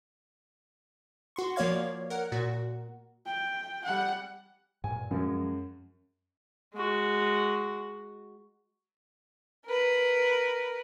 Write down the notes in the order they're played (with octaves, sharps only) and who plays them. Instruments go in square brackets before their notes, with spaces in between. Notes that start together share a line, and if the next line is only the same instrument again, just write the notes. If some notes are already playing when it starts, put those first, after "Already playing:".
[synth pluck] F#4 C6 C#6
F3 A#3 C#5 D5 F5 G#6
A#4 F#5
A#2 F#4
[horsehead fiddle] G5
G3 F#5
[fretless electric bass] G2 A#2 [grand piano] G#5
[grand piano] F#2 [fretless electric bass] F3 F#3 G#3
[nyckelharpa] G#3 F#4
[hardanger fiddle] A#4 B4